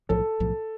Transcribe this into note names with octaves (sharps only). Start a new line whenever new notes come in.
B1 A2 F3 A4
B1 A2 F3